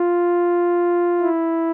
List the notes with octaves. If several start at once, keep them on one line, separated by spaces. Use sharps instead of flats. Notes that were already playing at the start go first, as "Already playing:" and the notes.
Already playing: F4
E4